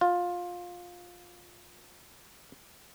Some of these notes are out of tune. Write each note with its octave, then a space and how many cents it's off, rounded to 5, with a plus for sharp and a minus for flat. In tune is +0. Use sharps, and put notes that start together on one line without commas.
F4 +15